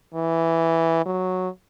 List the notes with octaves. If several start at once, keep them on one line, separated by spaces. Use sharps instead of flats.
E3
F#3